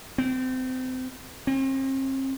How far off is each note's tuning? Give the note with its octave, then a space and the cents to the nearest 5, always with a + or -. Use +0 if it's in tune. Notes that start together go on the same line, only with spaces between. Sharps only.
C4 -30
C4 +40